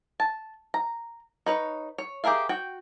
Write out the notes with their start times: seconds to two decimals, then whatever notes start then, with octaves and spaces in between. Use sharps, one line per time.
0.20 A5
0.74 A#5
1.46 D#4 B4 C#5
1.98 C#5
2.24 G4 G#4 A#4 E5 F5
2.49 F#4 G5